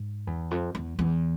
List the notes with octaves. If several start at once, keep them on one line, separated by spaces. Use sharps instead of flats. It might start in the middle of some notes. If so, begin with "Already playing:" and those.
Already playing: G#2
E2
F2
E2
E2